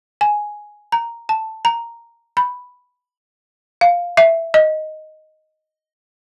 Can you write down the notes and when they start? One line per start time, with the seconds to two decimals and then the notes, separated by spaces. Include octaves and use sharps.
0.21 G#5
0.92 A#5
1.29 A5
1.65 A#5
2.37 B5
3.81 F5
4.17 E5
4.54 D#5